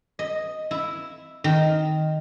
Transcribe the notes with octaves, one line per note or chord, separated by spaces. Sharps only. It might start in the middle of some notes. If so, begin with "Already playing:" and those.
D#5
E4
D#3